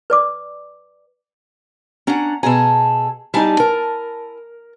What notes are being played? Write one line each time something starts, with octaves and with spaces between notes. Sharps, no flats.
B4 D5 D6
C#4 D4 F#5 A#5
B2 G#4 A4 G#5 A#5
G3 D#4 E4 G#5 A5
A#4